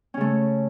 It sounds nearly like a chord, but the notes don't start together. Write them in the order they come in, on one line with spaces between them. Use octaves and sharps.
C#4 C#3 A3